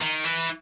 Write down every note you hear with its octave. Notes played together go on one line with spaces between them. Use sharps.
D#3
E3